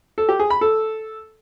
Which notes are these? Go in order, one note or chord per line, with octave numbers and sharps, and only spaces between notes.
A4
G4
G#4
B5
A4